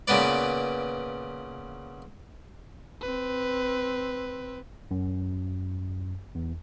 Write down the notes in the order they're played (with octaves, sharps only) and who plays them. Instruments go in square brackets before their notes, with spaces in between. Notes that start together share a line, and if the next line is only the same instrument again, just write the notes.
[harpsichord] A#2 C#3 B3 B4 D5
[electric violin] C4 B4
[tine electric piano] F#2
E2